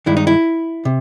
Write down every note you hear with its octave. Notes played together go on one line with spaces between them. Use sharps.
G2 D#3 G#3 E4
D#4
E4
C3